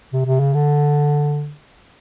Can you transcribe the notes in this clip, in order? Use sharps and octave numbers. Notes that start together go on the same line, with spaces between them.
C3
C3
C#3
D3